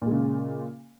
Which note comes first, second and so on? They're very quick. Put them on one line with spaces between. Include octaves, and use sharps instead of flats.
A#2 G#3 C#3